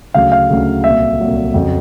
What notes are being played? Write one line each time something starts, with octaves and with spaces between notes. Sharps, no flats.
D2 C#3 F#3 F5
F5
D2 C#3 F#3
C2 A#2 F#3 E5
C2 A#2 F#3
F2 C#3 F#3